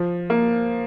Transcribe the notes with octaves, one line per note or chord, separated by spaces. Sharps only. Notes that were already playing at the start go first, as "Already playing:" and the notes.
Already playing: F3
A#3